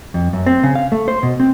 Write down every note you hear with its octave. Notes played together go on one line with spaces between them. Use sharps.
F2
F#2
C4
C#3
F5
A3
C5
B2
C4